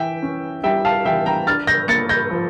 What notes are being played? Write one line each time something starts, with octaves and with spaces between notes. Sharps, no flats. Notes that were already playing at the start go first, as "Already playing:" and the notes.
Already playing: E3 E5 G5
C#4
G3 E5 G5
F5 A5
E3 E5 G5
G5 A#5
D4 F6 A6
G6 A#6
A#3 A6 C#7
G6 A#6
F3